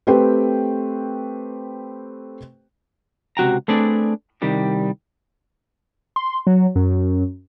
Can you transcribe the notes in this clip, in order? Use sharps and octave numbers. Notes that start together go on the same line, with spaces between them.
A3 C4 G4 B4 C5 G5
C#2 C3 F#4 G5 A#5
A3 C4 D4 G#4 B4 D5
C2 D#3 G3 G4
C6
F#3
F#2